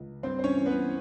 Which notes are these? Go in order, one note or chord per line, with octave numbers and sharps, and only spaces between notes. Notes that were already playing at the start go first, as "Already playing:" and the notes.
Already playing: C#2
G2 C4 C5
C5
C#4 C#5
E3
B3 B4